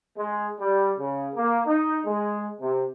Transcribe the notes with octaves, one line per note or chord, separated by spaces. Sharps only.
G#3
G3
C#3
A#3
D#4
G#3
C3